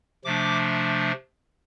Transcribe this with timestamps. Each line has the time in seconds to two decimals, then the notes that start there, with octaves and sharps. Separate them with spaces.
0.25 C3 F3 A3 D4 D6